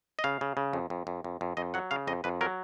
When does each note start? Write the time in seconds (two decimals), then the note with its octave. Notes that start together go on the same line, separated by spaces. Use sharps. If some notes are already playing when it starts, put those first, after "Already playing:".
0.19 D#5
0.24 C#3 F5
0.41 C#3
0.57 C#3
0.73 F2
0.90 F2
1.07 F2
1.24 F2
1.41 F2
1.57 F2 D#5
1.74 F#3 F#5
1.91 C#3 F5
2.07 F2 D#5
2.24 F2 B4
2.41 F#3 A#4